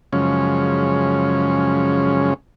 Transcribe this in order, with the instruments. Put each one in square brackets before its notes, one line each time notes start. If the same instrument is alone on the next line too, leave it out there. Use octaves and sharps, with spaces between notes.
[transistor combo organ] F#2 C#3 F3 G#3 C#4